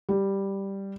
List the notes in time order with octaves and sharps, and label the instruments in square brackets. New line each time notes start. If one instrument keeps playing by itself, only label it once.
[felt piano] G3